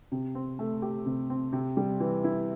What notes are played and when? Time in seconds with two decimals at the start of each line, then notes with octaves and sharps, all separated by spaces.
0.12 C3
0.35 C4
0.59 A3
0.82 G4
1.06 C3
1.30 C4
1.53 C3
1.77 G3
2.00 E3
2.24 E4